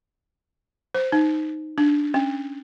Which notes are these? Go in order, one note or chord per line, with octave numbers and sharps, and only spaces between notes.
C5
D#4
D4
C#4